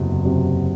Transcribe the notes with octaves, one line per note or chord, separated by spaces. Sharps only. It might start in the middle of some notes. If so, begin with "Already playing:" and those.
Already playing: F#1 E2 C3 F#3
C3 F#3